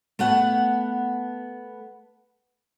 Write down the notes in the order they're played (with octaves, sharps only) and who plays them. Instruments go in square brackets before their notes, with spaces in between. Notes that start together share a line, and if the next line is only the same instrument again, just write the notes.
[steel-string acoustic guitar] A3 B3 F#5